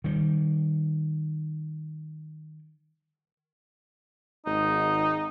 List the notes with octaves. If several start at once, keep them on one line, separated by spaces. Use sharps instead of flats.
D#3 G3
G#1 D#4